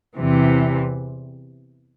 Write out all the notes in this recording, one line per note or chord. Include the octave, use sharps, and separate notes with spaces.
E2 C3 E3